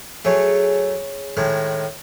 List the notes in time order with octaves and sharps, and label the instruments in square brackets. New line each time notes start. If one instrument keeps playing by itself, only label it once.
[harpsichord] F#3 A3 [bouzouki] G#4 C#5
[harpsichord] A2 D#3 G#3